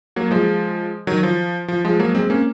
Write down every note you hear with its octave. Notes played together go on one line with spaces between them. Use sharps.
F#3 A#3
F3 G#3
D#3 F#3
F3
F3
F3 G#3
F#3 A#3
G#3 C4
A#3 C#4